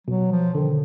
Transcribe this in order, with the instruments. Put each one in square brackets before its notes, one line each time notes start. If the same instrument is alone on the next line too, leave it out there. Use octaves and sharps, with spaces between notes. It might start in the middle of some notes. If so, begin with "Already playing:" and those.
[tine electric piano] B2 [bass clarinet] F#3
[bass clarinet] F3
[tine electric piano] D3 [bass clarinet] D#3